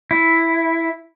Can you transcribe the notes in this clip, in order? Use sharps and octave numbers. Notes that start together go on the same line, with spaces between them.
E4